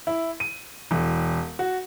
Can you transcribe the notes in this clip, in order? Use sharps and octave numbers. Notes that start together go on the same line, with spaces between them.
E4
D#7
E1
F#4